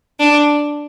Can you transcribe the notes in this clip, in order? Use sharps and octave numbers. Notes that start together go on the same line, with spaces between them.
D4